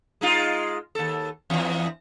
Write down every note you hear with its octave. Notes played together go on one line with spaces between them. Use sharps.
G#3 D#4 F4
D#2 A4
E2 E3